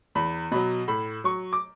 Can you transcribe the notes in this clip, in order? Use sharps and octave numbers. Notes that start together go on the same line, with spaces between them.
E2 B5
B2 F#3 B5
A2 B5
F#3 C#6
D6